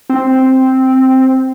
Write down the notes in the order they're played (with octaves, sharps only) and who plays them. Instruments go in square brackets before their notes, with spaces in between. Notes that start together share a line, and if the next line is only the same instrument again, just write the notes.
[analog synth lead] C4